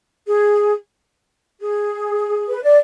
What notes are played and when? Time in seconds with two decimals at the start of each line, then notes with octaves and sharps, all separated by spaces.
0.27 G#4
1.60 G#4
2.48 B4
2.63 D5